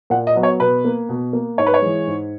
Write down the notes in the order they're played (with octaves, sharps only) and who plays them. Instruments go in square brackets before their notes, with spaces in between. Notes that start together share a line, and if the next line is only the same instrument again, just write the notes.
[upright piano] A#2 F#5
D#5
F#3 B3
C#5
B2 B4
A#3
B2
A#3
G#2 C#5
B4
C#5
E3 G#3
G#2